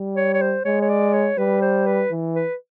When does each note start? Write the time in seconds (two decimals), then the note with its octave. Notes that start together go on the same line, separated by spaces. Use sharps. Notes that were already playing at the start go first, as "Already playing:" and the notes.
Already playing: G3
0.16 C#5
0.34 C#5
0.41 C5
0.65 G#3 C#5
0.82 C#5
0.89 D5
1.14 C#5
1.38 G3 B4
1.62 C5
1.86 B4
2.11 E3
2.35 B4